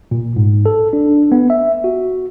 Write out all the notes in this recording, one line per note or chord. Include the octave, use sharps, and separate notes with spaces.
A#2
G#2
A4
D4
B3
E5
F#4